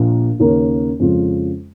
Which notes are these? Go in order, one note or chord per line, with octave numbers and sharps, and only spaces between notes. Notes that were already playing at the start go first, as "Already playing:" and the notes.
Already playing: A#1 A#2 A#3 F4
D#2 C#3 A#3 C#4 A#4
F2 C#3 G#3 F4